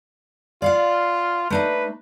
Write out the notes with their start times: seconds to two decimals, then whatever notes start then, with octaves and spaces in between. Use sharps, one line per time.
0.62 F4 D5 F5 F#5
1.50 A3 D4 D#4 B4